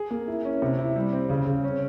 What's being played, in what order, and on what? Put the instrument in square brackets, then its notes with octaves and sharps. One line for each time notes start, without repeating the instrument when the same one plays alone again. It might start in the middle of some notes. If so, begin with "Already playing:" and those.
Already playing: [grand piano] G#4
A#3
E4
C#4
C3
E4
G3
C4
C#3
C#3
C#4